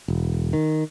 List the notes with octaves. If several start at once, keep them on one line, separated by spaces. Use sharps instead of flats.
E1
D#3